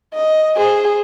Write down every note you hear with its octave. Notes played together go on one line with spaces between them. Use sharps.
D#5
G#4 C5